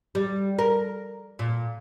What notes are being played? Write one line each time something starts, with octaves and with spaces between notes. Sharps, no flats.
G3
A#4
A#2